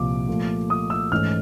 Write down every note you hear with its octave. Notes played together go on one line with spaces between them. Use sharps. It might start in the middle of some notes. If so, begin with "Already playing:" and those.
Already playing: C2 A#2 F3 D6
A#2 F3 A3
D#6
E6
G#2 E3 A3 C#4 F6